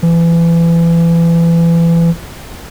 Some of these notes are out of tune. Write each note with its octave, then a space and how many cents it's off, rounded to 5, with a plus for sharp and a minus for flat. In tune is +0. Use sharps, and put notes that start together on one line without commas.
E3 +30